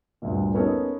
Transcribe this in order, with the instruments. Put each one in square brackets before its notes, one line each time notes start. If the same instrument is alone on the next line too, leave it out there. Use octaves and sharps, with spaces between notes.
[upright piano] D2 G2 A#2
A#3 B3 C#4 D#4 A4